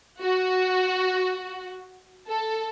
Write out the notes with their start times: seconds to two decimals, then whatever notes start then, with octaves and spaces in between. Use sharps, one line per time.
0.22 F#4
2.29 A4